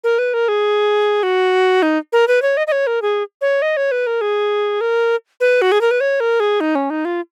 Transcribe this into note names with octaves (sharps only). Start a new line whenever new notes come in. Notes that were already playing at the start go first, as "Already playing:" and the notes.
A#4
B4
A#4
G#4
F#4
D#4
A#4
B4
C#5
D#5
D#5
C#5
A#4
G#4
C#5
D#5
C#5
B4
A#4
G#4
A#4
B4
F#4
G#4
A#4
B4
C#5
A#4
G#4
D#4
C#4
D#4
F4